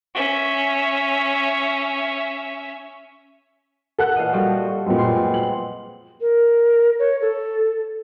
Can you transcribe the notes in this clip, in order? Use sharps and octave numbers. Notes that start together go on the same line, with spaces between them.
C#4 E5
A4 F#5 F#6
A#2 E3 D#5 F5
A#2 F3 G3 F#4
F#2 A#2 G#3 B3 C4
C6
F#7
A#4
C#5
A4